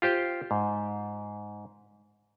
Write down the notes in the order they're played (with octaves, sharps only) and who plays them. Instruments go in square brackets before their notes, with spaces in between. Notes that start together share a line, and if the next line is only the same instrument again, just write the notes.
[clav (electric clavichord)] F4 G4 C5 G5
G#2